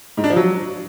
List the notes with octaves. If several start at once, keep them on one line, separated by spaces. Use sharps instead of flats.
G#2
D4
F3
F#3